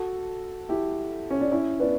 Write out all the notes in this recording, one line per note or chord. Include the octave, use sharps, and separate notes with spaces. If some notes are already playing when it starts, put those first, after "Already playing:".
Already playing: F#4 A4
E4 G4
C#4
D4
C#4 E4
B3 D4